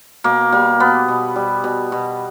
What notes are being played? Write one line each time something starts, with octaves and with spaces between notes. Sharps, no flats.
B2 A#3
G3 A#3
B2 B3
B2
G3
B2
B2